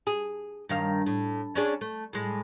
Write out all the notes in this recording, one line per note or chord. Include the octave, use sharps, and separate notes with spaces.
G#4
G2 D#3 F5
A2
C#4 D4 G#4
A3
A2 G#3